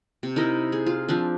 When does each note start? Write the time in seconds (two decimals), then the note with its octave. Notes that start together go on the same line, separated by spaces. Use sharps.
0.23 C3
0.36 D#4 E4 A#4 D#5
0.72 G#4
0.86 F4
1.08 F3 C4 D4